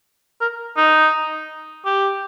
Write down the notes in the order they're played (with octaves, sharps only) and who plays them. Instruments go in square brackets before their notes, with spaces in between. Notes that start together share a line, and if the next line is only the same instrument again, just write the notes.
[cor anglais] A#4
D#4
G4